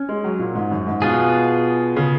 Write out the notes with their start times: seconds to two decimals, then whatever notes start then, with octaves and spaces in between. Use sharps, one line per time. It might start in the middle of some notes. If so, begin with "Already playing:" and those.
Already playing: C#4
0.09 G#3
0.24 F#3
0.39 A#2
0.55 G#2
0.71 F#2
0.87 G#2
1.02 B2 B3 F4 G#4
1.96 C#3